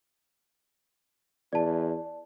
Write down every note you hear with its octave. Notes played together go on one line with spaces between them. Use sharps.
E2 D5 A5